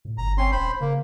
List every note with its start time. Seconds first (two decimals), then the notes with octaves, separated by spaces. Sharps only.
0.05 A2
0.18 G1 A#5
0.38 C4 C#4 C6
0.52 D#1 C5 B5
0.80 C#3 A#3